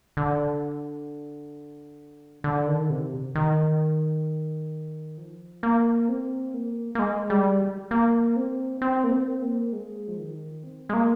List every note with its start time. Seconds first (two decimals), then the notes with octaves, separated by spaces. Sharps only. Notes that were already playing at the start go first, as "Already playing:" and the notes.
0.17 D3
2.44 D3
2.68 D#3
2.90 C3
3.35 D#3
5.18 F3
5.63 A#3
6.09 C4
6.54 A#3
6.95 A#3
6.99 G#3
7.30 G3
7.91 A#3
8.36 C4
8.82 C4
9.04 A#3
9.12 C4
9.42 A#3
9.73 G#3
10.08 F3
10.18 D#3
10.64 C4
10.89 G#3
10.94 A#3